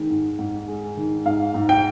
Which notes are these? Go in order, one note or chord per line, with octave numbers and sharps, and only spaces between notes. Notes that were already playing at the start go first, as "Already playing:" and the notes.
Already playing: D#3 G#3
G#2
G#2
G#3
D#3
G#2 F5
G#2
G5